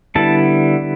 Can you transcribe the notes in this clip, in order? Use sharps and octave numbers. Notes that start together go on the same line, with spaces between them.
D3 G3 B3 E4 A5